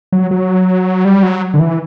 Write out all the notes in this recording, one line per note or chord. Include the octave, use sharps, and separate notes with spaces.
F#3
F#3
G3
F#3
D3
E3